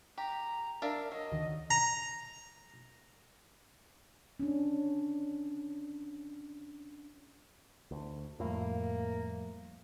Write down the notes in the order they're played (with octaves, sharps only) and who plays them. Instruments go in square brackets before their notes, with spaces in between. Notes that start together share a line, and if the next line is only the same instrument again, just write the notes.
[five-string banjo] G4 [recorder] A#5
[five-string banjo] D4 E5 F5 [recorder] A#4
[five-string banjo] F#3 [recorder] D#5
[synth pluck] D2 D3 D#3
[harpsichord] A#5
[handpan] C#4 D4
[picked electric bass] D2
[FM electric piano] F2 A2 [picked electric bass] F3 G3 A3 [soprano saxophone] A#3